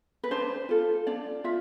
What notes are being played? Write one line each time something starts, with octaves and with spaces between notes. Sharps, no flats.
B4
D4 C5
F4 A4
D4 D5
F4 E5